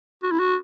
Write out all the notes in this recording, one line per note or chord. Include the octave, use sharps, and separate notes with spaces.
F#4
E4
F#4